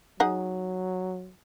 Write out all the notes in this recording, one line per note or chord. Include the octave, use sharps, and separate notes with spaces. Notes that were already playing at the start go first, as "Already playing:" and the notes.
F#3 D#4 G#4 F#5